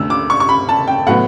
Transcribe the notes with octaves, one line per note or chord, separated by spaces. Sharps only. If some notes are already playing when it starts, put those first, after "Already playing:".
Already playing: D2 D3 A3 E6
D6
C#6
C#6
B5
A5
G5
A2 F#3 B3 F#5